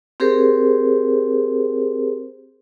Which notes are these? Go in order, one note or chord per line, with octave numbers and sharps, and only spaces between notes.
C4 G4 G#4 A#4 C5